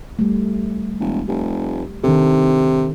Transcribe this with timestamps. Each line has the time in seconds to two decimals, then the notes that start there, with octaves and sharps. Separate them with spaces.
0.19 G3 A3
1.00 E1
1.28 F1 G4
2.04 C3 D#3 D4 A4